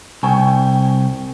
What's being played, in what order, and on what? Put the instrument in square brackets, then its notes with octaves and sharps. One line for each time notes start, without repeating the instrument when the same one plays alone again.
[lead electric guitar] C2 [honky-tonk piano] G5 G#5 C#6